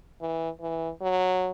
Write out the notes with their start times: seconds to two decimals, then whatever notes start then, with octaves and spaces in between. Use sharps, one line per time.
0.21 E3
0.61 E3
1.02 F#3